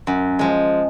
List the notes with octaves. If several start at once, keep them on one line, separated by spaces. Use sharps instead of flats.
F#2
F3 G#3